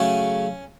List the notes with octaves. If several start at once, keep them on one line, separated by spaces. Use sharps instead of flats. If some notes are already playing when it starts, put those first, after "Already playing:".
Already playing: C#3 F#3 A3 C#4 C#5